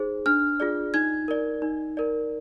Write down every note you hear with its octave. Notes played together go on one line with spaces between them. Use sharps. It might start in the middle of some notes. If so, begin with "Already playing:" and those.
Already playing: D#4 G#4 C5
D4 F6
F4 G#4 D5
D#4 G#6
A#4 D5
D#4
A#4 D5